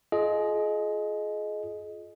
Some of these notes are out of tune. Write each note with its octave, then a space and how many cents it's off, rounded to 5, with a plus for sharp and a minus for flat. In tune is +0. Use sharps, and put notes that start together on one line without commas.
F4 +0 G#4 +35 D#5 +0